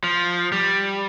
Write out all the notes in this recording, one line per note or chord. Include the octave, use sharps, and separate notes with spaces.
F3
G3